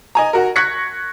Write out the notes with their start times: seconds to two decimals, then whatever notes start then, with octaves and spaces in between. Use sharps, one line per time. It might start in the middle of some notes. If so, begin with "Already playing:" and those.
0.15 D#5 G#5 A#5
0.33 F#4 A#4
0.56 C#6 F#6 G#6 A#6 B6 C#7